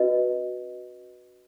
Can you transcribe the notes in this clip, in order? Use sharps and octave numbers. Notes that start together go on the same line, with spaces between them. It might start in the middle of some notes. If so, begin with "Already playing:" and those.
Already playing: C#4 F#4 B4 D#5